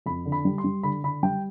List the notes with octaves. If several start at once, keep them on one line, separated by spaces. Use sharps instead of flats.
F2 B5
D3
B5
G3
C6
G3
D3 B5
D3 B5
G3 G5